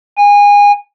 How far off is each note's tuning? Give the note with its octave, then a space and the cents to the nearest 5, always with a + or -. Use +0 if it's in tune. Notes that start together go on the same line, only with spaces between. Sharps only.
G#5 -25